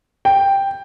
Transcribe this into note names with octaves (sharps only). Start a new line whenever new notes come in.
G5